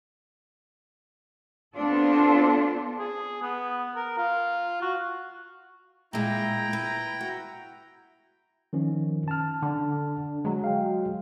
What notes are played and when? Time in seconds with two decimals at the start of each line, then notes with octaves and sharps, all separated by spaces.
1.76 B3 C4 D4 F4 A4
2.99 G#4
3.42 B3
3.96 A#4
4.18 F4
4.82 F#4
6.13 A#2 G#3 E4 G5 A#5
6.73 B4
7.21 F#4
8.73 D#3 F3 C#4
9.28 A5 F6
9.62 D3
10.45 F#3 G#3
10.64 F5 G5